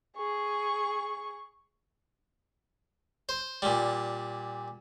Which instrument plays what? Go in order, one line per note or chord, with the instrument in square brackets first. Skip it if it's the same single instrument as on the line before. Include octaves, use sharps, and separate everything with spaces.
[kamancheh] G#4 C#6
[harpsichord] C5
A#2 G3